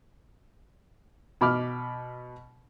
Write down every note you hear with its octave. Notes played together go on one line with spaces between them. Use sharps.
B2 B5 D6 F6